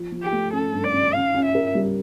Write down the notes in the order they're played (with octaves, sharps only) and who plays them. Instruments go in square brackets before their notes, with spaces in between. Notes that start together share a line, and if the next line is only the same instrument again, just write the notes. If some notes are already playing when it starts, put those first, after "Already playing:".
Already playing: [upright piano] F3
F3
[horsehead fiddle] G4
[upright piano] A3
[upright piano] C#4 [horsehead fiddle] A4
[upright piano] G2
[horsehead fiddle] D5
[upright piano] C#4
[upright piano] C#4 [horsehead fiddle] F5
[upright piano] C#4
[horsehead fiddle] E5
[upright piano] A#4
G3